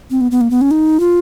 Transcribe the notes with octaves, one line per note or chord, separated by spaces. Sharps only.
C4
B3
B3
A#3
B3
C#4
D#4
F4